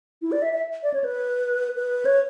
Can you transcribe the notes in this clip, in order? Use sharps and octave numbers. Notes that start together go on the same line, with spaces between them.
E4
D5
E5
E5
D5
C#5
B4
B4
C#5